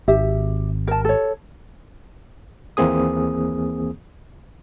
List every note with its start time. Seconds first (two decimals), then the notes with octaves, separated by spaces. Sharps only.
0.08 G#1 G4 E5
0.87 A#4 A5
1.05 A4 C#5
2.77 D#2 E3 A#3 C4 G#4 D#6